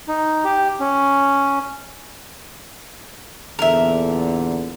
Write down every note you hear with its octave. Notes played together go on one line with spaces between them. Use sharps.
D#4
G4
C#4
E2 A#2 D3 A#4 E5